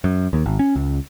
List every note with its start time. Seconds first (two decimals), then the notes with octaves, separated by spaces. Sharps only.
0.04 F#2
0.33 D#2
0.46 G#1
0.59 C#4
0.76 C#2